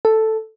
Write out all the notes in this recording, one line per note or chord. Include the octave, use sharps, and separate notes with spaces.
A4